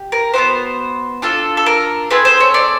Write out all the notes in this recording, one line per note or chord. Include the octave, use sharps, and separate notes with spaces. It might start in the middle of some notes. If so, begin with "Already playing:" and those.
Already playing: G4
A#4
B3 D#4 F#4 C5
D4 F4 A4
A4
A#4
A3 C4 G#4 B4
C5
C#5
D5